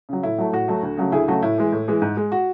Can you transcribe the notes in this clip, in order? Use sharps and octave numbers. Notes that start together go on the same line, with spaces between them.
C#3 F#3
A2 E4
F#3 A3
A2 F#4
F#3 A3
D2
C#3 F#3 A3
D2 E4 G#4
C#3 F#3 A3 F#4
A2 E4
E3 G#3
A2
E3 G#3
G#2
G#3
F#4